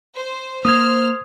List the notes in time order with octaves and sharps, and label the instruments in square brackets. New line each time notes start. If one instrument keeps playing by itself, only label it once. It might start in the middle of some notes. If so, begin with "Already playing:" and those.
[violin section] C5
[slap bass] A#3 [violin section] C5 F6 [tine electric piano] D#6 G#6